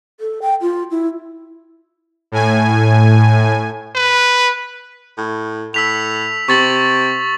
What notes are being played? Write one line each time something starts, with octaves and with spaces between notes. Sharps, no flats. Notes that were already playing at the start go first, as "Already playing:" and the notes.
A4
G5
F4
E4
A2 G#5
B4
A2
A2 E6 B6 F7
C3 C#6 A6 F#7